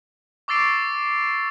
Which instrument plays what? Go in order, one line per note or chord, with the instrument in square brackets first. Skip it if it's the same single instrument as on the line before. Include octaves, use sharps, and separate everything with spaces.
[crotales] C#6 D6 E6 A6 C7 D7